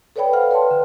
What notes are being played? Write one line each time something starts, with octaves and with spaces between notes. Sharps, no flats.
A4 B4 C#5 D5 G5 B5
A4 C5 F5 F#5 F6
B4 C#5 A5 C6
D3